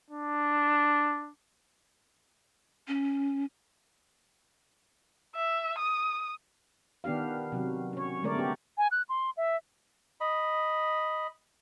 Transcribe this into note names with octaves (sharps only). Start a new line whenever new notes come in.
D4
C#4
E5
D#6
D#3 B3 D4 G4 F5
C3 F#3
C#4 C#5
D3 G#3 A3 A#4 C#5 D5
B3 C#4 G4
G#5
F#6
C6
E5
D#5 B5